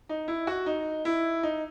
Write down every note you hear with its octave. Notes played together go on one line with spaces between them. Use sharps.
D#4
E4
F#4
D#4
E4
D#4